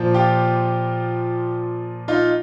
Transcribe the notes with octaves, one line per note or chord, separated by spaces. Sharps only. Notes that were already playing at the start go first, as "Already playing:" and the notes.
Already playing: A#2 F3
F4 G4
D#4 F4